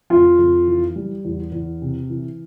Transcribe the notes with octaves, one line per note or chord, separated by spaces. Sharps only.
F2 F4
F2
E3
G3
E2
E2
C3
E3